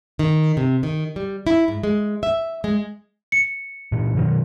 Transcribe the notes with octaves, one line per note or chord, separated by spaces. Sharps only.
D#3
C3
D#3
G3
E4
G#2
G#3
E5
G#3
C#7
A#2 E3
B2 D#3 F#3